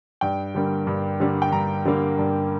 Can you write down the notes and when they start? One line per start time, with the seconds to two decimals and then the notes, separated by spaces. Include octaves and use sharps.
0.21 G2 G5
0.55 D3 G3 A#3
0.87 G2
1.20 D3 G3 A#3
1.42 G5
1.52 G2 A#5
1.85 D3 G3 A#3
2.18 G2